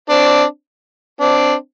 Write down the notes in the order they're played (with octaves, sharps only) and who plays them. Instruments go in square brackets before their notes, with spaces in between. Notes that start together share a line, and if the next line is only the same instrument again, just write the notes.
[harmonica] C4 D4
C4 D4